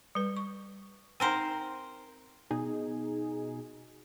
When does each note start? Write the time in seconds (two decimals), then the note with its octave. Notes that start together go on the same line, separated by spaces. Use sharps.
0.15 G3 B4
0.37 C#6
1.20 C4 D#4 A#4 C5 F#5 G#5
2.51 B2 D#4 G#4